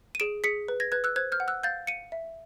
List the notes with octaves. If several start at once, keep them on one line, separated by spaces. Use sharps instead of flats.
D#7
G#4 D7 E7
G#4 B6 C#7
B4
G#6 A#6
B4 F#6 G#6
E6 F#6
C5 F#6 G#6
F6 G6
F#5
E6 F#6
F5 G6 A6
F5 C#7 D#7
E5